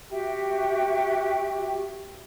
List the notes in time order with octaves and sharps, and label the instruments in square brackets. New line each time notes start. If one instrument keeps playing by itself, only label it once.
[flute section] F#4 G4 E5 G5